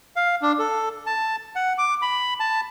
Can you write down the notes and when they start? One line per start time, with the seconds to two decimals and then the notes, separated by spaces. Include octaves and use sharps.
0.16 F5
0.42 D4
0.59 A4
1.06 A5
1.56 F#5
1.78 D6
2.02 B5
2.40 A5